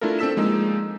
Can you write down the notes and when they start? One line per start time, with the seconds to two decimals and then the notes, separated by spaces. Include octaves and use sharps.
0.01 A3 D4 E4 F4 A4 A#4
0.19 C4 D4 A4 E6 B6 E7
0.37 F3 G#3 A#3 D#4